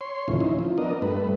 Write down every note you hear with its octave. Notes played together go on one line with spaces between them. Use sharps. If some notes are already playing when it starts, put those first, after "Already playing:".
C#5 C6
D#2 A2 C#3 E3 F3
C#4 D#4 E4
F3
B3 D4 A#4 D#5
G2 A3 B4